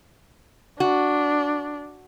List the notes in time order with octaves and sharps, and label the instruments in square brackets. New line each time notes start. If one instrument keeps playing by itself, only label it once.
[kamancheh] D4 [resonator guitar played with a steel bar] F#4